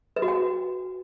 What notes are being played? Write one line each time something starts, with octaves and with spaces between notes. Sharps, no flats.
B4
F#4
G5